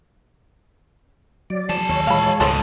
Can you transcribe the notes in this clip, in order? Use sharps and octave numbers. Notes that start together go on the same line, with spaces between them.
F#3 D5
F3 G#4 A5
D#2 C#5
A#2 D#3 E3 G#3 C#5 F5 B5
C#2 G#2 B2 A4 C5